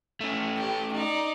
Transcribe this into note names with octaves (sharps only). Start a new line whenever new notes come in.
A3 C#4
G4
D#4 D5